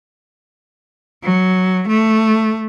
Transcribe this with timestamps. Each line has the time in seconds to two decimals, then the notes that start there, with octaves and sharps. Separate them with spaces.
1.24 F#3
1.88 A3